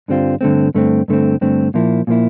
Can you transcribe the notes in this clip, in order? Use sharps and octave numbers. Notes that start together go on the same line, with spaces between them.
G2 D3 G3 C4 F4
G2 D3 A3 C4
G2 D3 A3 C4
G2 D3 A3 C4
G2 D3 A3 C4
A#2 F3 A#3 E4
A#2 F3 A#3 E4